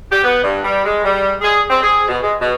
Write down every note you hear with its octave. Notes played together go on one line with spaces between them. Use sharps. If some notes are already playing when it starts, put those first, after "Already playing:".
G4
B3
G2
G3
G#3
G3
G#4
C4
G#4
B2
G#3
B2